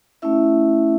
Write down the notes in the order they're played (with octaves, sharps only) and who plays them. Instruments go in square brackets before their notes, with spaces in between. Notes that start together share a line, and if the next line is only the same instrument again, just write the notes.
[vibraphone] A3 C#4 E4 E5